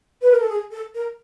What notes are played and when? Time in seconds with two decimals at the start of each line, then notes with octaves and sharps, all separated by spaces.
0.22 B4
0.31 A#4
0.40 A4
0.49 G#4
0.71 A4
0.94 A#4